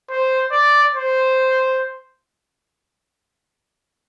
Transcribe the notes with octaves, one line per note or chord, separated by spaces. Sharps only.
C5
D5
C5